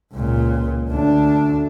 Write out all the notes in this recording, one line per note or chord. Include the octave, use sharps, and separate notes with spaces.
C#2 A#2
D2 D4